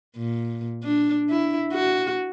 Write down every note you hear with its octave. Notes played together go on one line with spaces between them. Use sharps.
A#2
D4
E4
F#4